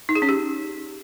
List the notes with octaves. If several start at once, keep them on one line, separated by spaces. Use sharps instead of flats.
D#4
G#4
C#4
G4